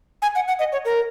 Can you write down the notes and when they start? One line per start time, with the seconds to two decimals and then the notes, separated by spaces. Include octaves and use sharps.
0.22 G#5
0.35 F#5
0.48 F#5
0.59 D#5
0.72 C#5
0.85 A#4